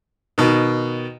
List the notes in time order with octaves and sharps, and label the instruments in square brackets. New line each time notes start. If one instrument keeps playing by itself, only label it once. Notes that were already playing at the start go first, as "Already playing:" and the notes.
[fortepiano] B2 D#3